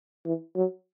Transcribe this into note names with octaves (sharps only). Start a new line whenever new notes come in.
E3
F#3